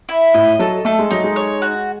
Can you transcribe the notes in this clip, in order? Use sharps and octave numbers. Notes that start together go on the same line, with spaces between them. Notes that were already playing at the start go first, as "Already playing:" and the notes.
E4
A2 D#5
F#3 A4
A3 A4
G#3
F#3 D#4
G#3
C#5
F#4